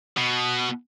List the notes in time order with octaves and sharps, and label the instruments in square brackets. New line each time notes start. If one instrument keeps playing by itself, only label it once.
[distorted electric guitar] B2